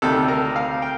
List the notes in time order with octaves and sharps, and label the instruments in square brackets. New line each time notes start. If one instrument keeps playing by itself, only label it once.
[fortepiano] D2 C3 D#3 A4
A#4
F5
G5